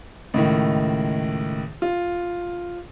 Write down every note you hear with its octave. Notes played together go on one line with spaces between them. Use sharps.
C#2 A2 D#3
F4